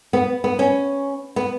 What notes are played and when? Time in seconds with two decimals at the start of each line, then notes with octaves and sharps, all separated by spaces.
0.13 B3
0.44 B3
0.59 C#4
1.36 B3